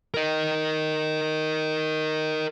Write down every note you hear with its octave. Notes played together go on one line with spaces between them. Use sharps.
A#4 D#5